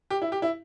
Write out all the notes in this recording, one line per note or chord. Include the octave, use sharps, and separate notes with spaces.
G4
E4
G4
E4